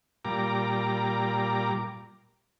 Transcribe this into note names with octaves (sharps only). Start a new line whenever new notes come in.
A#2 G3 A#5 D6